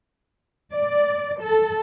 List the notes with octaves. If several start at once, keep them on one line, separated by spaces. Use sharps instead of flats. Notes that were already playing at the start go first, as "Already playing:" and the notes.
D5
A4